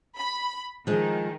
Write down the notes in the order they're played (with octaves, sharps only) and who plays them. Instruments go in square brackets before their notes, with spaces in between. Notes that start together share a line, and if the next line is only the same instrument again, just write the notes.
[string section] B5
[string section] D#3 [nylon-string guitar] F3 G#3